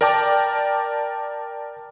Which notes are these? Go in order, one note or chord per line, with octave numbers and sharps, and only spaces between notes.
A#4 D5 G5 A5 D6